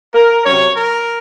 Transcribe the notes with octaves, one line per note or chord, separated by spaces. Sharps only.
A#4
C3 F#3 C#5
A#4